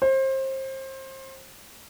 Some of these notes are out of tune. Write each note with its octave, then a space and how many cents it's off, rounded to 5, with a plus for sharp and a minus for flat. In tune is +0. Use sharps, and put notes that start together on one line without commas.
C5 +30